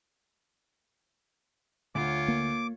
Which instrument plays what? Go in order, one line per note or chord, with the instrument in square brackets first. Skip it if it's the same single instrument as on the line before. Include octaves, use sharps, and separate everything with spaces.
[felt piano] D2 [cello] F4 C#5 [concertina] D6
[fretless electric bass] A#3